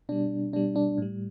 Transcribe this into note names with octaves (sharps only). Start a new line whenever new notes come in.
B2 G3 D4
B2 G3 D4
D4
A2 G3